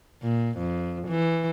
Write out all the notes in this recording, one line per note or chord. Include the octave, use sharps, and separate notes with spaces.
A#2
F2
E3